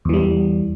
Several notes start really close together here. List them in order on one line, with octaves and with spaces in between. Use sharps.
E2 E3 G3